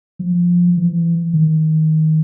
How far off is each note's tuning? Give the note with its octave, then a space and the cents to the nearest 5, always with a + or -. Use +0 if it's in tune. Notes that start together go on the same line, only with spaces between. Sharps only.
F3 +10
E3 +30
D#3 +15